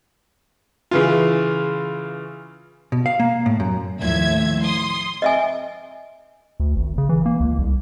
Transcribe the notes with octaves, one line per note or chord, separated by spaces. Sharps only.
C#3 E3 F4
B2
F5
A#3
A2
F#2
D#2 A2 F3 E5 G#6
C6 D#6
D#5 E5 G#5
D2
G#1
C#3
E3
A#3
C#2
C2